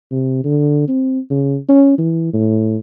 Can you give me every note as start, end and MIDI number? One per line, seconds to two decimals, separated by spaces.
0.11 0.40 48
0.44 0.86 50
0.88 1.19 60
1.30 1.58 49
1.69 1.94 61
1.98 2.29 52
2.33 2.77 45